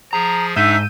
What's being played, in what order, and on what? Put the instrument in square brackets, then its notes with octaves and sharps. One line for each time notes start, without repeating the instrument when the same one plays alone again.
[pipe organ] F3 G#4 [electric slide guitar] A#5
[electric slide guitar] G#2 [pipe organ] D4 D#4 [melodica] E5 [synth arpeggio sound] E6 G6 D#7